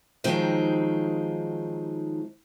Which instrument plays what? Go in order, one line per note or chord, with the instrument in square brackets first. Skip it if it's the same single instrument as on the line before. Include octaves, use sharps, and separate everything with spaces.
[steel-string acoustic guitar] D#3 F3 F#3 G#3 C4 D#4